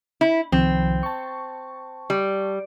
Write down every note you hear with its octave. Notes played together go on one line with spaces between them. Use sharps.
E4
C2 D#3 F3 C4
A5 C#6
G3